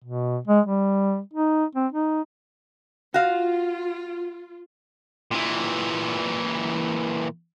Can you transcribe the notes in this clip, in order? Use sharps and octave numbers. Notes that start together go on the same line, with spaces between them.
B2
G#3
G3
D#4
C4
D#4
F4 F#4 F5
A#2 E3